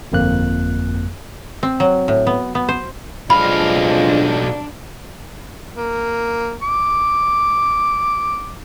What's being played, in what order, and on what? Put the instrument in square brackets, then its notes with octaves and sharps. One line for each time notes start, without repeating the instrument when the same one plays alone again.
[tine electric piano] G1 F2 A#3 F#6
[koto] C4
F#3
A2
B3
B3
C5
[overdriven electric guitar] B1 F5 [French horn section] F3 G#3 F4 [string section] D4 [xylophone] B5
[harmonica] A#3
D6